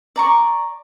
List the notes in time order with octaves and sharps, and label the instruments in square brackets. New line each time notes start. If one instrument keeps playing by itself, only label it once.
[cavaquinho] D5 A#5 C#6